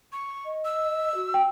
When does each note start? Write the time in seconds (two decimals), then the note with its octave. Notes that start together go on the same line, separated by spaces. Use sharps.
0.12 C#6
0.45 D#5
0.65 E6
1.14 F#4
1.34 G5